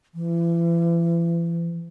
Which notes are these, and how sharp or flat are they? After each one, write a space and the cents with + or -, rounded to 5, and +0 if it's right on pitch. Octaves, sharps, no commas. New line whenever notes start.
E3 +40